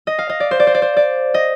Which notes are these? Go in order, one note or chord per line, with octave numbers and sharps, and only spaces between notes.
D#5
F5
D#5
D5
C5
D5
C5
D5
C5
D5
D#5